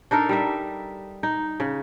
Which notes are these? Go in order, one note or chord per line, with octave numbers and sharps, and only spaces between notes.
D4 D#4 A4 A#4
G3 D#4 E5
D#4
C#3